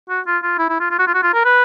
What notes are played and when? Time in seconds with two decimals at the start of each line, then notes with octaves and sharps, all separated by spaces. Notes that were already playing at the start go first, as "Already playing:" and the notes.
0.09 F#4
0.27 F4
0.43 F4
0.59 E4
0.69 E4
0.80 F4
0.91 F4
0.99 F#4
1.07 F4
1.14 F#4
1.23 F4
1.34 A#4
1.45 B4